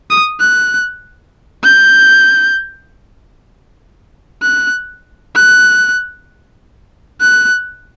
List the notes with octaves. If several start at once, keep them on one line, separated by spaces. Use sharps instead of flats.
D#6
F#6
G6
F#6
F#6
F#6